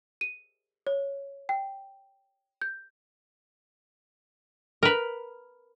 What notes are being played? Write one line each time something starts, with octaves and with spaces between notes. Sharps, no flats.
D#7
C#5
G5
G6
A#4 B4